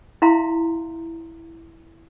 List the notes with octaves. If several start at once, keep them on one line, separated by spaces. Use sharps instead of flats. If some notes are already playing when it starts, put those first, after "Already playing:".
E4 E5 F5 A#5 C6